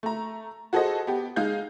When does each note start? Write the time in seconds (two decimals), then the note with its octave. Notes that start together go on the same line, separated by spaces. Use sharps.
0.03 A3 A#5
0.73 F#4 G#4 A4 C5 D#5
1.07 B3 G4
1.36 G#3 D#4 G#4 F5 G6